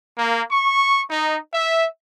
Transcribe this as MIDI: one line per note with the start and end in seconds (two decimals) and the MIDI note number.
0.18 0.43 58
0.51 1.02 85
1.10 1.38 63
1.54 1.86 76